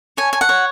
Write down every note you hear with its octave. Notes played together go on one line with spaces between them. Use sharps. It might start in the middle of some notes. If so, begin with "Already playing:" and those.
C#5 G#5
G#5
F#5
C#5